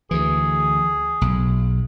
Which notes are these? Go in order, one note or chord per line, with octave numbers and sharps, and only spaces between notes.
D2 E3 G#4
B1